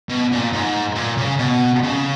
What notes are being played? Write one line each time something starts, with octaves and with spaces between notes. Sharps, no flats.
B2
A#2
G#2
A#2
C#3
B2
C#3